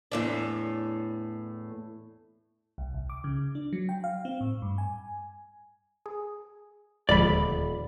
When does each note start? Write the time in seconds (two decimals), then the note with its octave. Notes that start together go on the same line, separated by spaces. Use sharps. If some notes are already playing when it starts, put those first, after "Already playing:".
0.12 E2 A2 D4
2.78 C2
2.94 C2
3.10 D6
3.24 C#3
3.55 D4
3.73 F#3
3.89 G5
4.04 F5
4.25 C4
4.41 A2
4.62 G2
4.78 G#5
6.06 G#4
7.09 D#1 D2 F3 G#3 D5 B5